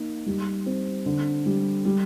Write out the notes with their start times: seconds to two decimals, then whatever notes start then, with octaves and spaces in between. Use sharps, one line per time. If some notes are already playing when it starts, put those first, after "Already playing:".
Already playing: A#3 D#4
0.26 G3
0.66 C4
1.06 D3
1.46 G3
1.85 G3